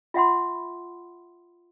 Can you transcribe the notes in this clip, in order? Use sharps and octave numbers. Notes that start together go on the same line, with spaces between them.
F4 E5 F#5 B5 C6